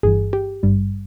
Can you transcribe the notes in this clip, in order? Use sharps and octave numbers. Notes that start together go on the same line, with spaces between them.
G1 G2 E3 G#4
G4
G#1 G2 G3